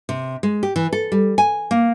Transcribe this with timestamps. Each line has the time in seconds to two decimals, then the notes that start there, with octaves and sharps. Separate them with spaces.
0.09 C3
0.43 G#3
0.63 G4
0.76 E3
0.93 A4
1.12 G3
1.38 G#5
1.71 A#3